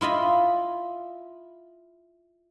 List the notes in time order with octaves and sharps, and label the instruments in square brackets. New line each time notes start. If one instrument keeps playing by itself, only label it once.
[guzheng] E4 F4 D#5 B5